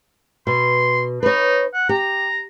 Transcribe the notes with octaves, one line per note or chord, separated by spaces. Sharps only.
B2 C6
D#4 B4 C#5
F#5
G4 A#5